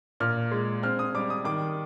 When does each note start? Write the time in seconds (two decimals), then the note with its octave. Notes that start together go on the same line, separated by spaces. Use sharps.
0.20 A#2 F6
0.51 G#3
0.83 C4 F6
0.99 D#6
1.14 G3 D6
1.30 D#6
1.45 D#3 D6